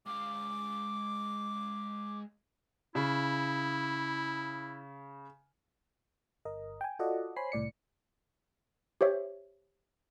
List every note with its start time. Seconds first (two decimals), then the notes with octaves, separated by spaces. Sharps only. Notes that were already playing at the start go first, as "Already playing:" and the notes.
0.06 G#3 F5 D6
2.95 C#3 E4
6.45 G1 A#4 D#5
6.81 G5 G#5
6.99 F4 F#4 A4 D5 D#5 F#5
7.36 C5 C#5 G#5 B5 C7
7.52 C2 A2 D5 C#7
9.01 G4 C5 C#5 E5